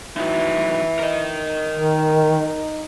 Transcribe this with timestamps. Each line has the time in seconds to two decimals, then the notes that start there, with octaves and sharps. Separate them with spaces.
0.17 D#3 E3 F#3
0.99 A#4 D#5
1.74 D#3
2.36 D#4